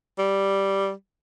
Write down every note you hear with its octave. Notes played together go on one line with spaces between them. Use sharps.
G3